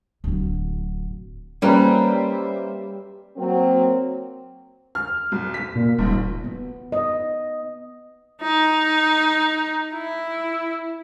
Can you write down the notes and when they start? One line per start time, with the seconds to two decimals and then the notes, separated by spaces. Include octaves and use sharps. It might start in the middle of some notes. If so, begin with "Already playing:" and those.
0.24 D1 F#3
1.62 G3 A#3 C#4 B4 C5 E5 A#5
3.37 F#3 A#3 C4
4.95 F6
5.32 B1
5.54 B6
5.76 A#2
5.98 D#1 A#1 G#2
6.44 B3
6.92 D#5
8.42 D#4
9.95 E4